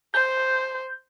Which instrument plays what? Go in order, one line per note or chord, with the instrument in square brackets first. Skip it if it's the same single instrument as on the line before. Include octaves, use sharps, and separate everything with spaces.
[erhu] C5 [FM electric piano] G6